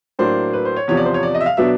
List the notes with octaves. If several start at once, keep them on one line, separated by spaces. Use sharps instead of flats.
A2 F#3 A#3 D4 C5
B4
C5
C#5
E2 C3 F3 C#5
D5
C5
C#5
D5
D#5
E5
F5
B2 F#3 B3 D4 E5